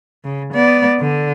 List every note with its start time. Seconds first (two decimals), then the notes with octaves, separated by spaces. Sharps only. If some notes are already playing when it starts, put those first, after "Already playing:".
0.24 C#3
0.53 B3 D5
0.99 D3